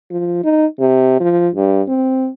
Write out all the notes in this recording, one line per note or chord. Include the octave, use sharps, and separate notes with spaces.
F3
D#4
C3
F3
G2
C4